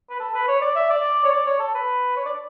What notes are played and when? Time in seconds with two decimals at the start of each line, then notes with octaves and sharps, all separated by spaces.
0.10 B4
0.20 A4
0.34 B4
0.48 C#5
0.61 D5
0.75 E5
0.90 D5
1.24 C#5
1.32 D5
1.46 C#5
1.60 A4
1.75 B4
2.17 C#5
2.26 D5